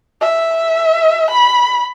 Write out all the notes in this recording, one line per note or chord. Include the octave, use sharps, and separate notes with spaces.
E5
B5